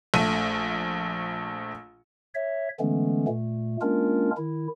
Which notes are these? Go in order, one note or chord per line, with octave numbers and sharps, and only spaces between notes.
A#1 A3 D#7
C#5 E5
D3 E3 G#3 A3 B3 C#4
A#2 A3
G#3 A#3 C#4 D4 F4 A#4
D#3 E4